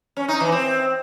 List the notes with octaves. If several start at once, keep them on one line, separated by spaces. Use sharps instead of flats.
C#4
D#4
E3
C4